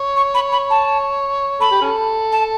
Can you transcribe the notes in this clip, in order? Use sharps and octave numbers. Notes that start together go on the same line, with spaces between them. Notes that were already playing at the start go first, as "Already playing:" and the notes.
Already playing: C#5
C#6
B5
B5
A5
A4 B5
G4
C#4 A4
A5